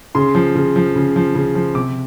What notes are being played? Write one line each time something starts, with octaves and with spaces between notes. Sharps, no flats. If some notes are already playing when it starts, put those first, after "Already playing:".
C#3 C6
F3
C#3
F3
C#3
F3
C#3
F3
C3 D6